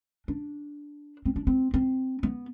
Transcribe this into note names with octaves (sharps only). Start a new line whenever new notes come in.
D4
C4
D4
C4
C4
B3